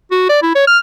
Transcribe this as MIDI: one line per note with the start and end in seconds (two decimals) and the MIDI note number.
0.11 0.27 66
0.29 0.38 74
0.42 0.55 64
0.55 0.64 73
0.67 0.78 89